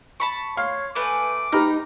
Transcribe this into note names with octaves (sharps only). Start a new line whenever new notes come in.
A5 B5 C#6
C#5 F5 C6
A3 B4 G#5 D6
D#4 G4 B4 A#5 F6